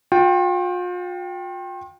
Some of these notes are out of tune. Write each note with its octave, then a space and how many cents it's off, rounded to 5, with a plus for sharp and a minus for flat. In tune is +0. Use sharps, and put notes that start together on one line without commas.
F4 +40 G5 +0